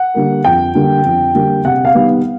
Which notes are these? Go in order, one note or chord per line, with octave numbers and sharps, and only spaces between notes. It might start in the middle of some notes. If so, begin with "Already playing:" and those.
Already playing: F#5
D3 G3 A#3
F2 G5
D3 G3 A#3
F2
D3 G3 A#3
C3 F#5
F5
D#3 G3 B3